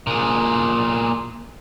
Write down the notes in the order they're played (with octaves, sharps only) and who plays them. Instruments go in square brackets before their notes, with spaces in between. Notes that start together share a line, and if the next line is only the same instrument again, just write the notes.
[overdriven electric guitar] A#2 G#4